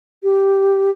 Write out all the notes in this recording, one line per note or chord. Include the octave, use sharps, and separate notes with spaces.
G4